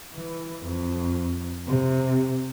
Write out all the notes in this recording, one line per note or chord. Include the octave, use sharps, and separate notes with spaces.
E3
F2
C3